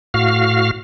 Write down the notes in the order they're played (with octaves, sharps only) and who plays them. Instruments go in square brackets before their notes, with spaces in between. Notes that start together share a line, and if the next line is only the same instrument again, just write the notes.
[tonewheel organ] A2 F#4 F5 F6